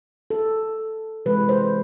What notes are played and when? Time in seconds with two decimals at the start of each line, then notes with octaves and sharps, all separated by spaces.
0.30 A4
1.26 C3 E3 G#3 B4
1.49 C5